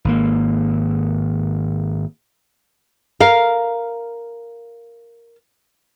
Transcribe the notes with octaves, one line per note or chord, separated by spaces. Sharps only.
G#1 A#3
A#4 F5